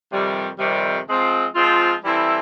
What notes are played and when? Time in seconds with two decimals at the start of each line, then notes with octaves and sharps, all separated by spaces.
0.11 F2 C3 D#3 G3
0.59 F2 C3 D#3 G3
1.07 F3 G#3 C4 F4
1.55 F3 G#3 C4 F4
2.03 E3 G3 C4 E4 A4